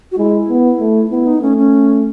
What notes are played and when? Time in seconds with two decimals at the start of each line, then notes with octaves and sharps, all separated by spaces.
0.12 F#4
0.17 G#3 E4
0.49 B3
0.80 A3
1.10 B3 E4
1.27 D#4
1.42 A3 C#4
1.57 C#4